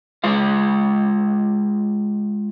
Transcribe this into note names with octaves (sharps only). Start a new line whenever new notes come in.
G#3 F4 F5